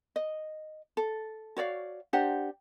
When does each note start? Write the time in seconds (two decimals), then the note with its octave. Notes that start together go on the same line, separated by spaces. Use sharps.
0.16 D#5
0.97 A4
1.57 F#4 C#5 D5 F5
2.13 D4 G4 C5 F#5